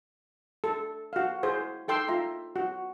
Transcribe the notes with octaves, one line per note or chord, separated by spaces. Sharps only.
A4
F#4 F5
E4 G#4 C5
D#4 A4 G5 C6 E6
F4 E5 A#5 C6
F#4